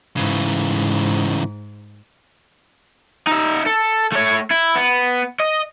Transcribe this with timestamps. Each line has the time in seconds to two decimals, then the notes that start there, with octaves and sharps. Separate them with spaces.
0.17 G#2 C#3 E3
3.27 D#4 E5
3.66 A4
4.13 A3 C#5
4.51 E4
4.76 B3
5.40 D#5